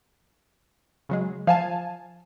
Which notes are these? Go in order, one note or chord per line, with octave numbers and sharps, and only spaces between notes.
C#3 F#3 G#3
F3 F5 G#5 A5